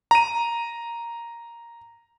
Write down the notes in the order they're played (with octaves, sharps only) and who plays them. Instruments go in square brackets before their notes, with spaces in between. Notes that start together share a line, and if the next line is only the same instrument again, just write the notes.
[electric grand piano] A#5 D#7